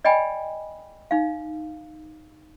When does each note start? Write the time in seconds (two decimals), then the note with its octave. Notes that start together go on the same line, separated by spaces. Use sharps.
0.04 D5 D#5 G5 G#5 B5
1.11 D#4 F5